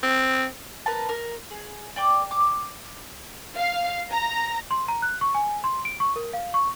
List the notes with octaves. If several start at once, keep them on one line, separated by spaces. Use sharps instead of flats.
C4
A#4 B4 A5
A#4
G#4
D5 G5 D6
D6
F5
A#5
C6
A#5
F#6
C#6
G#5
C6
D7
C#6
A#4
F5
C#6